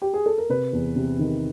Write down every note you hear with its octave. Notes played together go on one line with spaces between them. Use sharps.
G4
G#4
A4
A#4
C3 B4
E2
C3
D#3